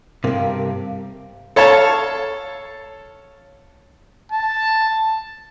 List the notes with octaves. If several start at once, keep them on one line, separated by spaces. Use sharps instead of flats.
G2 C3 A#3 G4
A4 C#5 F5 A5
A5